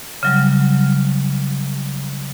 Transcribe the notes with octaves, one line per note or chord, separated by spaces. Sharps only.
C#3 F#3 G3